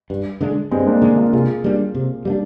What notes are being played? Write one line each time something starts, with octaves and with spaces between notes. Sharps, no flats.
G2
D3 G#3 D4
G2 G#3 C4
A#3 D4
D3 G#3 D4
D4 F4
C3 F4 G#4
G3 A#3 D4
C3
G3 A#3 D4